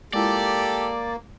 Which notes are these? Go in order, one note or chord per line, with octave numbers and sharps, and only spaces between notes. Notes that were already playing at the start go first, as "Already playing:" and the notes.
G#3 A#3 E4 F4 G4 A4 D5